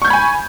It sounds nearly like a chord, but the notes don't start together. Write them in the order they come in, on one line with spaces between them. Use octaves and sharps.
C#6 G6 G#6 B5 G#5